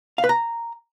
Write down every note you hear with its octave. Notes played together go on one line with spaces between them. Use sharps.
F5
B4
A#5